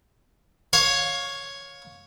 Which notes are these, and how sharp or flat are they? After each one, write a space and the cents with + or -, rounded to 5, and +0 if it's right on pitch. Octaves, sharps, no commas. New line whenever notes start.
C#5 +0 F5 +25